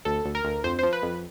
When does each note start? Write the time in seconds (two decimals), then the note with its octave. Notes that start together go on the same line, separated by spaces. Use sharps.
0.05 D2 A4
0.25 D2
0.35 A#4
0.45 D2
0.64 F2 C5
0.79 F3 C5
0.93 B4
1.03 F2